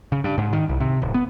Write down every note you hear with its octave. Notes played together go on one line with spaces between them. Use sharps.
C#3
G2
G#2
D#3
C2
C3
D1
B3